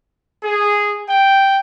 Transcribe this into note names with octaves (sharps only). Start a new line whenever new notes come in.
G#4
G5